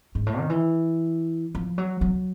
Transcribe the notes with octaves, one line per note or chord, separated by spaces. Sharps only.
G#2
A2
D#3
E3
F3
F#3
F#3